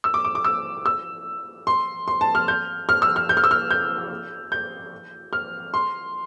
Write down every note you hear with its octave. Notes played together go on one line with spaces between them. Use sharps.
E6
D6
D6
D6
E6
E6
C6
C6
A5
F6
G6
F6
E6
F6
G6
F6
E6
F6
G6
G6
F6
C6